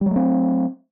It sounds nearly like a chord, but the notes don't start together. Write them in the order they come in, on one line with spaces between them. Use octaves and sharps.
G3 F#3 A3 C4